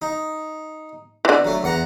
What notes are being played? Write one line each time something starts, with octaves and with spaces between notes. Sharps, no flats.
D#4
D3 E3
F#3 A3
E2 F#5 A#5